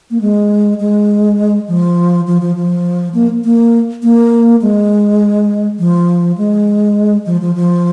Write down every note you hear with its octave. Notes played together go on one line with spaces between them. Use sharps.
A#3
G#3
G#3
F3
F3
F3
F3
A#3
A#3
A#3
G#3
F3
G#3
F3
F3
F3